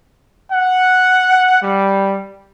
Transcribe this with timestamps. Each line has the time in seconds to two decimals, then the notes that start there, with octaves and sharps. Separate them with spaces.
0.52 F#5
1.62 G3